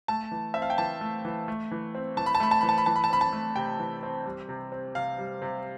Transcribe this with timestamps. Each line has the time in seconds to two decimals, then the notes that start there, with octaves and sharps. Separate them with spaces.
0.08 A3 A5
0.31 E3
0.54 C4 E5
0.62 F5
0.70 G5
0.78 E3 A5
1.01 A3
1.25 E3
1.48 A3
1.71 E3
1.95 C4
2.17 E3 A5
2.26 B5
2.35 A5
2.40 A3 B5
2.51 A5
2.61 E3 B5
2.69 A5
2.78 B5
2.86 E3 A5
2.96 B5
3.04 A5
3.10 C4 B5
3.21 A5
3.33 A3
3.56 C3 G5
3.79 E3
4.03 C4
4.26 G3
4.49 C3
4.72 C4
4.95 C3 F5
5.19 G3
5.42 C3